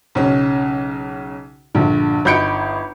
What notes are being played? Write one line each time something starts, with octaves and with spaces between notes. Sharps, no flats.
B1 C#3 C#4
A#1 G2 D3
G1 D#4 B5 G6 C#7 D7